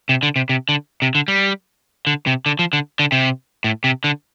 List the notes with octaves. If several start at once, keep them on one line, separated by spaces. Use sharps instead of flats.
C3
D3
C3
C3
D3
C3
D3
G3
D3
C3
D3
F3
D3
D3
C3
A2
C3
D3